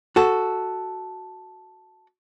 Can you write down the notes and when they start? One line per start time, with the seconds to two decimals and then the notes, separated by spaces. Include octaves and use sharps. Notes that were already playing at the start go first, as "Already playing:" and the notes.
0.16 F#4 A4